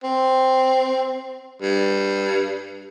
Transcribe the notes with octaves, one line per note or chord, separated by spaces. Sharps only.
C4
G2